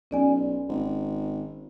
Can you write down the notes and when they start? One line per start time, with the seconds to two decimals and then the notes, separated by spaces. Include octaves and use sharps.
0.11 B1 C#4 D5 G#5
0.69 G#1